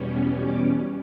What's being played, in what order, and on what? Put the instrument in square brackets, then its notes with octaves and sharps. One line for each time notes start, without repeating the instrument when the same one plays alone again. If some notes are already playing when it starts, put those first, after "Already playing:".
Already playing: [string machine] E2 B2 G3 C#4
D6